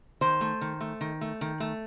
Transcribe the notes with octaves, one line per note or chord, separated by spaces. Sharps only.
D#3 C5
A3
D#3
A3
D#3
A3
D#3
A3